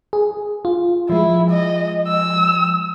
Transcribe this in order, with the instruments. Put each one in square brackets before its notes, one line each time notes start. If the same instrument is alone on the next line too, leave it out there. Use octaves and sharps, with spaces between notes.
[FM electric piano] G#4
F4
[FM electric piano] F3 G#3 [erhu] E4
[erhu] D#5
E6